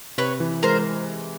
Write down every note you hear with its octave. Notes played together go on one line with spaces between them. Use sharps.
C3 B4 C#5
E3
G#3 A#4 C5